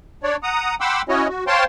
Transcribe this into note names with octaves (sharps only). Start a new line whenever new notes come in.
D4 C#5 D5
F#5 A#5 D#6
F#5 G5 B5 C6 D6 E6
C#4 E4 F#4 C#5 D#5
F#4
C5 C#5 F5 G5 A5 C6